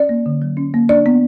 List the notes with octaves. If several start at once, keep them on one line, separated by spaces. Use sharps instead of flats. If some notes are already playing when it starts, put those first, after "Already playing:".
Already playing: C#4 D5
A#3
D3
F#3
C#4
A#3
D4 D5
B3